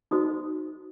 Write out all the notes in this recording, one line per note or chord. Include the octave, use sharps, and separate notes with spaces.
D#4 F#4 C5 D#6